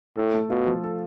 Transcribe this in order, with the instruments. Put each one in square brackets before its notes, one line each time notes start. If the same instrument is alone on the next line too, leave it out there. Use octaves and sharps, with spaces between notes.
[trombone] A2 [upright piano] A4
[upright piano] A3
[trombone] B2 [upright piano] F4
[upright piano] F3
A4